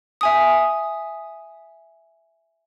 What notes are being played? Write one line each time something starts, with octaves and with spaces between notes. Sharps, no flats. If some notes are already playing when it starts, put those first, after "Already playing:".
E5 G#5 D#6